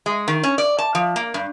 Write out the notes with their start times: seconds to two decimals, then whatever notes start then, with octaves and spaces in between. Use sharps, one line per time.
0.06 G#3
0.28 D#3
0.43 C#4
0.58 D5
0.78 A5
0.95 F3
1.16 A#3
1.34 G2